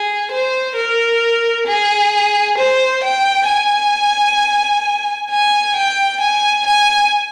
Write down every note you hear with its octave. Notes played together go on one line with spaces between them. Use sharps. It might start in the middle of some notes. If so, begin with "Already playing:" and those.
Already playing: G#4
C5
A#4
G#4
C5
G5
G#5
G#5
G5
G#5
G#5